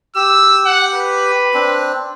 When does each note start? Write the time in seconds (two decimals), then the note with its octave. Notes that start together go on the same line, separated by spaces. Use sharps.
0.15 G4 E6
0.65 F#5
0.95 B4
1.54 C4 D4